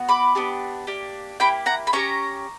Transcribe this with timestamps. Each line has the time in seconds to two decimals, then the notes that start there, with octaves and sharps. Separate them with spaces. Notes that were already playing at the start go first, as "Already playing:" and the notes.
Already playing: B3 F#4
0.09 B5 D6
0.35 B3 D4 G4
0.87 A#3 D4 G4
1.40 A#3 E4 G4 G5 B5
1.66 F#5 A#5
1.87 B5
1.93 C#4 G4 A#5 C#6